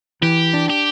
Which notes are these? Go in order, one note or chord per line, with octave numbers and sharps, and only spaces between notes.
E3 G4
D4
G4